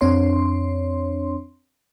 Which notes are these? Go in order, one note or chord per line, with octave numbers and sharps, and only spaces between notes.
F2 C4 D4 C#5 C6